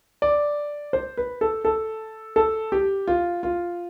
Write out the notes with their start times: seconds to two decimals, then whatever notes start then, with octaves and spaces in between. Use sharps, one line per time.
0.22 D5
0.93 C5
1.17 B4
1.41 A4
1.65 A4
2.36 A4
2.72 G4
3.08 F4
3.43 F4